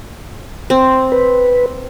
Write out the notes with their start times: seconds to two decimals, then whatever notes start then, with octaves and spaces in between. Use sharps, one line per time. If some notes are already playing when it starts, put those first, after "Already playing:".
0.70 C4
1.12 B4